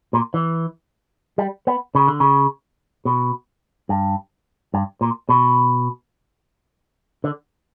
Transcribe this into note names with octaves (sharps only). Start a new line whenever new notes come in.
A#2
E3
G3
B3
C#3
D3
C#3
B2
G2
G2
A#2
B2
D3